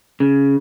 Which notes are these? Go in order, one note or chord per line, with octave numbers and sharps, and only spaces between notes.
C#3